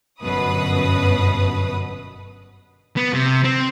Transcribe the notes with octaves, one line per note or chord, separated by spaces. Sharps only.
G1 F#2 B2 B4 D#6
B3
C3
C4